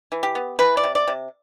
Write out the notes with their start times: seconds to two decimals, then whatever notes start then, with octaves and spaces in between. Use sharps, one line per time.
0.12 E3
0.23 G4
0.35 B3
0.59 E3 B4
0.77 D5
0.84 C3
0.95 D5
1.08 C3